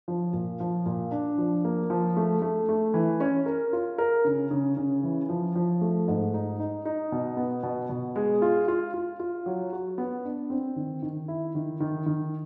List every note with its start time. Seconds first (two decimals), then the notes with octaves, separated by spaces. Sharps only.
0.08 F3
0.33 A#2
0.60 F3
0.86 A#2
1.11 D4
1.38 F3
1.65 A#3
1.90 F3
2.17 A3
2.42 A3
2.69 A3
2.94 E3
3.20 C#4
3.46 A#4
3.73 F4
3.98 A#4
4.25 C#3
4.51 C#3
4.77 C#3
5.03 E3
5.29 F3
5.55 F3
5.81 A3
6.08 G#2
6.34 D#4
6.59 D#4
6.85 D#4
7.12 B2
7.37 B3
7.63 B2
7.89 B2
8.16 G#3
8.42 F4
8.68 F4
8.94 F4
9.20 F4
9.46 F#3
9.73 F#4
9.98 B3
10.25 D4
10.50 C4
10.76 D#3
11.02 D#3
11.28 E4
11.55 D#3
11.80 D#3
12.06 D#3